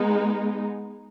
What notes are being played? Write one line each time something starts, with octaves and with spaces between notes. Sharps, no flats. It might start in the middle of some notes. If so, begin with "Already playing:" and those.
Already playing: G#3 B3 D#4